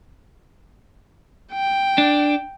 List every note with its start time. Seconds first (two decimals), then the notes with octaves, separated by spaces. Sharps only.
1.53 G5
1.98 D4